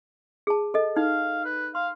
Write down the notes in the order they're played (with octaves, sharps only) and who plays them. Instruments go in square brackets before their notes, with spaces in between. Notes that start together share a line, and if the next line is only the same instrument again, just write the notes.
[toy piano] G#4 A5
A4 D#5
[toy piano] D#4 [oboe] F5
[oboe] B4
[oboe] F5 [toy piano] C6